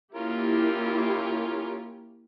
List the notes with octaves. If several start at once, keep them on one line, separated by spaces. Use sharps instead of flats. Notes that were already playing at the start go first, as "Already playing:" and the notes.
A#3 C#4 E4 F4 G4 A#4